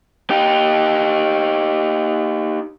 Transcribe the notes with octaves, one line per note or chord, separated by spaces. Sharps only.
D#4 G4